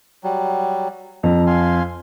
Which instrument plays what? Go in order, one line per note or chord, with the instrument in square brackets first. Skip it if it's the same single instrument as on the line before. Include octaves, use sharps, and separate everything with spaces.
[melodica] F#3 G3
[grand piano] F2 [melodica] A#5
[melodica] F5 G#5 C6